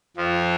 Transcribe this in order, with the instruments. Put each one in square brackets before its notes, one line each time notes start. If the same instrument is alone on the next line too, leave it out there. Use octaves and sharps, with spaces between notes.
[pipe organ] F2 F3